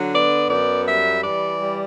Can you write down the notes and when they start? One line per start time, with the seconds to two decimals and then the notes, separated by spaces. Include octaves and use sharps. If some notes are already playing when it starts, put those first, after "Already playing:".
Already playing: D3 F#3
0.14 B3 D5
0.50 F#2 D5
0.88 G3 E5
1.24 E3 D5
1.61 G3